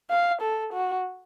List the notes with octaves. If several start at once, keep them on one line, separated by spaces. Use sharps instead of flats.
F5
A4
F#4